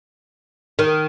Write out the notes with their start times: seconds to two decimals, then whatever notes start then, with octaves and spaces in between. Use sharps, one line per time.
0.79 D#3